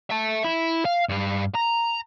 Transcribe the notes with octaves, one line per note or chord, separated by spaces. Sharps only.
E5 A5
E4
F5
G2 F5
A#5